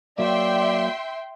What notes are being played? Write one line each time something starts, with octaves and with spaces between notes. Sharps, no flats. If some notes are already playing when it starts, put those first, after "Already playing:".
F#3 A#3 D5 E5 G5 C6